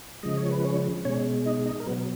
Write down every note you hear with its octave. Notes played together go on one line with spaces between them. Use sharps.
C#3 F3 G#3 D#5
C#5
B4
C#4 C#5
B2 G#3 C#4 C#5
D#4 D#5
D#4 D#5
A#4
B2 F#3 B3 B4